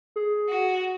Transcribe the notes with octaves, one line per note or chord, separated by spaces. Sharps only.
G#4
F#4